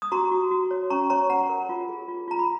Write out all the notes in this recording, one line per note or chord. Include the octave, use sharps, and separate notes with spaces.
D#6
F#4 A#5 C#6
F#4
F#4
C#5
C#4 A#5 C#6
C#5 A#5 C#6
C#5 F#5 A#5
A#4
F4
G#4
F4
F4 A#5
B5